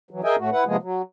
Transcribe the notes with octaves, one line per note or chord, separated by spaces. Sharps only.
E3 F#3
G#4 A#4 D#5 E5 G5 G#5
A2 A3 F#4
E4 B4 F#5
C3 F3 G#3 A#3 B3 G#4
F#3